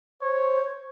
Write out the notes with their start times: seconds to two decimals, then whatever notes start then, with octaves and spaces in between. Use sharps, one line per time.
0.22 C5 C#5